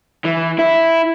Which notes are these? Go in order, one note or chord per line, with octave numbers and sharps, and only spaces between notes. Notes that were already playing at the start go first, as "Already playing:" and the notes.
E3
E4